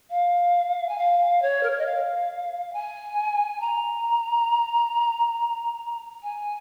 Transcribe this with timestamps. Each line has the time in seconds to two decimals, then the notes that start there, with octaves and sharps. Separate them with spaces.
0.10 F5
0.89 G#5
0.98 F5
1.42 C#5
1.63 A#4
1.70 C#5
1.79 D#5
1.86 F5
2.73 G#5
3.61 A#5
6.23 G#5